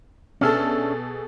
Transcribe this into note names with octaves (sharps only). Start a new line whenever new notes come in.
B2 C#4 D4 G#4 A4 E5